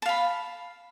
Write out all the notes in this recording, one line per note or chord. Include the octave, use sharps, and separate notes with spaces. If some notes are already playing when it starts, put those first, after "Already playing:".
F5 A5 B5